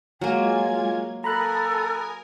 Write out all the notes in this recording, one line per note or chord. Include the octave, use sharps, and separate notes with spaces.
F#3 G#3 A#3 F4 G#5 G#6
A4 A#4 G#5 A#5 B5 D#6 F#6